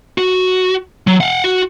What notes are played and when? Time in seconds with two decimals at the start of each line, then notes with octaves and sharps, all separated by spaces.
0.18 F#4
1.07 F#3
1.21 F5 F#5
1.44 F#4